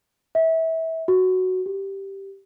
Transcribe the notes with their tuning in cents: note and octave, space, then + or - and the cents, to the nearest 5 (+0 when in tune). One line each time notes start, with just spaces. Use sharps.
E5 -25
F#4 +5
G4 -5